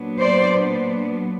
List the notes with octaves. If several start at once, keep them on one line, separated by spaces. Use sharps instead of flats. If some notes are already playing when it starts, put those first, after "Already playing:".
Already playing: A#2 F#3 B3 D4
C5 D5